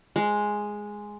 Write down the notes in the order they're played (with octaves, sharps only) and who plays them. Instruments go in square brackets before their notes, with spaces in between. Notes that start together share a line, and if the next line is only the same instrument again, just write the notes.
[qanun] G#3